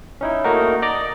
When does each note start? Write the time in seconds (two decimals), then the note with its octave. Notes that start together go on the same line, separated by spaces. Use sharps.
0.21 C#4 D#4 E4
0.44 A3 A#3 D#4 F#4 A#4
0.82 D5 D#5 A#5 D6